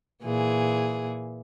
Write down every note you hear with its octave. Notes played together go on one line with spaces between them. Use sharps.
A#2 E3 G#4